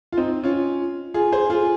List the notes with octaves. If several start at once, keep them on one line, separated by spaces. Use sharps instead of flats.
F4
C4 D#4
C#4 F4
F4 G#4
G#4 C5
F4 G#4